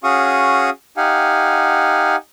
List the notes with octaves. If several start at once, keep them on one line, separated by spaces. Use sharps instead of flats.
C#4 F#4 G#4 F5 C#6 D#6
D#4 G4 F5 F#5 G#5